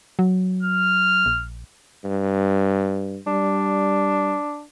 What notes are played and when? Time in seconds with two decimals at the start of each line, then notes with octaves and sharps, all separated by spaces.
0.19 F#3
0.63 F6
1.26 A#1
2.05 G2
3.27 G3 D4